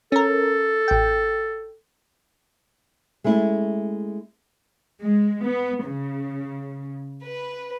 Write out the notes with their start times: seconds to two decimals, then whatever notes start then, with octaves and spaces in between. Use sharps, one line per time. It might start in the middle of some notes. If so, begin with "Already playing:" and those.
0.12 C#4 A4 A#4
0.88 A1 G5
3.24 G#3 A3 C#4 E4
5.02 G#3
5.45 B3
5.84 C#3
7.23 B4